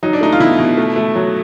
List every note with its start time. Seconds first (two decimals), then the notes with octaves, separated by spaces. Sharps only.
0.03 F#3 D#4
0.13 D4
0.21 A3 D#4
0.32 F4
0.40 B2 E4
0.59 B2
0.77 A3
0.96 A3
1.15 F#3